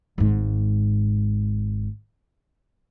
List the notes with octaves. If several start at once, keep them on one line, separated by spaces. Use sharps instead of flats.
G#1 G#2